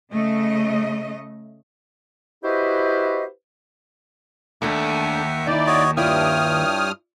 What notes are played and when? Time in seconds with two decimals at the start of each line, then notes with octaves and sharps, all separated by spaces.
0.12 C#3 A3 D#5
2.44 E4 F#4 G4 B4 C5 D#5
4.62 D#2 A3 D4 A4 E5 F#5
5.47 D#4 E4 D5
5.67 F#4 C#5 D#5
5.97 G2 E4 F4 C#5 D5 G5 D#6 F6